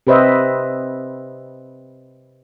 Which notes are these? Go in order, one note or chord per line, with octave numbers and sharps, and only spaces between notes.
C3 G4 B4 C5 D#5 E5